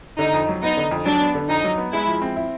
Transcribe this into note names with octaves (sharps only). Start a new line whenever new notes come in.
D3 D#4
F2
F#3
B3 D#4
D3
F2
F#3 D4
B3
D3
F2 D#4
F#3
B3
G#3 E4
F3
C4
E4